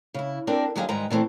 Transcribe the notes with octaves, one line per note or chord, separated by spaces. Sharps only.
C#3 E4
C4 D4 A4 A#4 D5
D#2 F#3 G4 G#4 D5 F5
G#2 D#3 G3 G#3 B4 A#5
A#2 E3 A3 C4